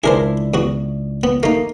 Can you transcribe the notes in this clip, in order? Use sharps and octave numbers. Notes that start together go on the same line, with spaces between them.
C#2 D4 E4 G#4 A#4 C5
E2 F#4
B3
A3 A#3 D#4